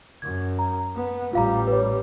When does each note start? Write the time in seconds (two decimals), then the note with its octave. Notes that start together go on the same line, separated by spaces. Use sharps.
0.22 F#2 G#6
0.59 A#5
0.95 B3
1.33 A1 G3 F4 F5 A#5
1.67 B4 C#5